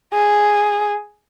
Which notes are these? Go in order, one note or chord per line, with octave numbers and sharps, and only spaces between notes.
G#4